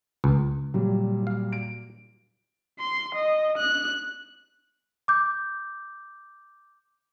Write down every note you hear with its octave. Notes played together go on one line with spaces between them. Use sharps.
C#2
A#2 F#3 G3
F5
D7
C6
D#5
F#6
D6 G6